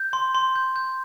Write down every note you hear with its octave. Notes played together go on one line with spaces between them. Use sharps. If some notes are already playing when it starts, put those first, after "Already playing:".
Already playing: G6
C6
C6
G6
G6